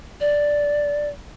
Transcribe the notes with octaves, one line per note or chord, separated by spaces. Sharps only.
D5